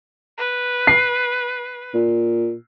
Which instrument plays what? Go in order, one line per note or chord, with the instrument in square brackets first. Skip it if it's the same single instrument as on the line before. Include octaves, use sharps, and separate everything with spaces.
[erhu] B4
[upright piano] C7
[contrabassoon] A#2